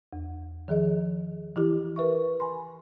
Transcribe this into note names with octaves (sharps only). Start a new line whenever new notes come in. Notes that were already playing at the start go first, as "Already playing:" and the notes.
E2
D#3 F3 G#4 D#5
E3 E4 G4
A#4 B4 E5 C#6
G#5 B5 C6